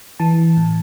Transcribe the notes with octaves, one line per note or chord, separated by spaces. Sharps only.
E3 A5
A2